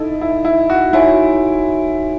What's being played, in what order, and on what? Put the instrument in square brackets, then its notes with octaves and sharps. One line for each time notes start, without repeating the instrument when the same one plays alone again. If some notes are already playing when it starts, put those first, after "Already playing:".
Already playing: [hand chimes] D#4 A4 D#5 A5 [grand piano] E4
[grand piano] E4
E4
F#4
[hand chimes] D#4 F#4 A4 C#5 G#5 [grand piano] E4